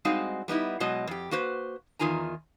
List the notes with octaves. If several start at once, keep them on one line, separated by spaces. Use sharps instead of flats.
G3 G#3 C4 D#4 F#4 F5
G3 B3 D#4 E4
B2 F#3 G#3 D#5
F2 G4
A#3 F#4 B4 C5
E2 D#3 F4 G#5 A#5